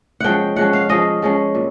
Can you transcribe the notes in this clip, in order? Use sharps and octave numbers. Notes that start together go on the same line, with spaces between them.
F3 G#3 C#4 F#5 G5
F3 G#3 C#4 F#5
F5
F3 G#3 C#4 D#5
F3 G#3 C#4
A#2